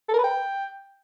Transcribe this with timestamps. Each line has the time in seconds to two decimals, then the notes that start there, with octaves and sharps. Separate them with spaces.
0.09 A4
0.14 A#4
0.19 B4
0.24 G5